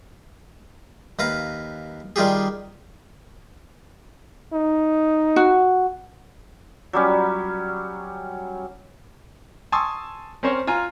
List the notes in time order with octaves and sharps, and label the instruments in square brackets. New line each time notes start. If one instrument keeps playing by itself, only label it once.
[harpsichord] D#2 B4 F5 A#5
D#3 G3 F4 G4 G#4
[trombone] D#4
[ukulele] F#4
[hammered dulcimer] F#3 G3 C#4
[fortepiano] G#5 A5 C6 C#6 D#6 E6
C4 C#4 A#4 C5 C#5
F4 G#5 A#5